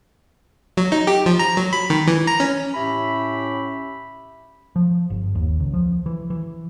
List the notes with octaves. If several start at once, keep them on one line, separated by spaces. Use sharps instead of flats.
F#3
D#4
G4
F3
A#5
F#3
B5
D#3
E3
A#5
C#4
A2 C#4 G4 E5 B5
F3
G1
D#2
C#2
F3
E3
E3